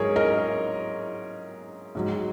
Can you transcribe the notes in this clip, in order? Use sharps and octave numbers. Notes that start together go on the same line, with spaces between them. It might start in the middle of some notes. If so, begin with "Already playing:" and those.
Already playing: G#2 F#3 G#4 A#4 C#5
A#4 D#5
G#2 F#3